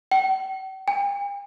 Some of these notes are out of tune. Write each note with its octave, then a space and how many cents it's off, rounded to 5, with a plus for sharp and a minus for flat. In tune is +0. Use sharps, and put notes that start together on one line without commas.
G5 -45
G5 +45